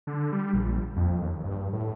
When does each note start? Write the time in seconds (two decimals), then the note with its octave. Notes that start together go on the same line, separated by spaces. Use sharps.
0.07 D3
0.32 G3
0.53 A#1
0.96 F2
1.21 D#2
1.44 G2
1.73 A2